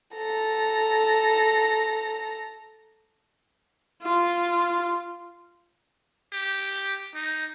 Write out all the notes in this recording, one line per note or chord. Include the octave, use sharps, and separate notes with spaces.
A4 A#5
F4
G4
D#4